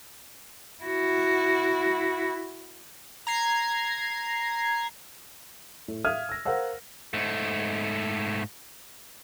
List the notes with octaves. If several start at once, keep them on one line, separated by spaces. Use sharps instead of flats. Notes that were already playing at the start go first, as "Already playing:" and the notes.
E4 F#4
A#5 G#6 C7
A2
E5 F5 D#6 F6 G#6 D#7
E6 A#6
A#4 C5 F5 F#5 E6
G#2 A3